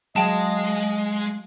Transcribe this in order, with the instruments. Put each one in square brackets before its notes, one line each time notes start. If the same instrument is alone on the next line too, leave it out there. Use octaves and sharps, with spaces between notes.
[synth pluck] F#3 F5 [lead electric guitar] G#3 [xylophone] G#4 G5 A5 [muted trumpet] D#5